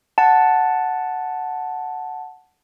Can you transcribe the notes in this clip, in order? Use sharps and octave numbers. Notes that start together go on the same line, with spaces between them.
F#5 A5